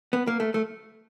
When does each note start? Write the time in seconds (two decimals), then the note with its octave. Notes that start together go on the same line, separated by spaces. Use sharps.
0.13 B3
0.27 A#3
0.40 A3
0.54 A3